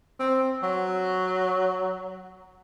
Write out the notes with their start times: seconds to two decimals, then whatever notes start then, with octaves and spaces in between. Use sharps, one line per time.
0.20 C4
0.63 F#3